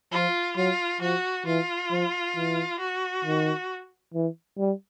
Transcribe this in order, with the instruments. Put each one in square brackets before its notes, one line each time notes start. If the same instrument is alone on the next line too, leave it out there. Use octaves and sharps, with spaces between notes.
[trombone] F3 [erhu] F4
[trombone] F#3 [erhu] F4
[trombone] F3 [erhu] F#4
[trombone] E3 [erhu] F4
[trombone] F3
E3
[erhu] F#4
[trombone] D#3
E3
G3